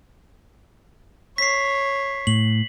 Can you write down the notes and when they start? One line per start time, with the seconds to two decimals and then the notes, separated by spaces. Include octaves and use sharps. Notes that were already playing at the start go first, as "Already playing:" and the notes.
1.38 C#5 B6 C7
2.27 A2 F#7